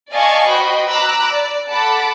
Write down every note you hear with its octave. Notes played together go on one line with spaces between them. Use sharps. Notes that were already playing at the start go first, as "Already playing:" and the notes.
D5 D#5 F5 G#5 A5 C#6
F#4 C5 D#5 G5 B5
A#5 B5 D6 E6 F#6
D5
A4 F#5 A5 B5 D6